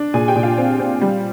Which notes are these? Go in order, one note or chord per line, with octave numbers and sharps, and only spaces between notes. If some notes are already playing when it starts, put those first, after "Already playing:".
Already playing: D4
A#2 G#4 G#5
G4 G5
A#2
F4 F5
C4
C4
G3